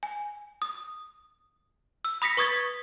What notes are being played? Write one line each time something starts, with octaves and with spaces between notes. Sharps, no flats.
G#5
D#6
E6
B5 D#6 A#6 B6 C#7
B4 C#6 D#6 G#6 A6 B6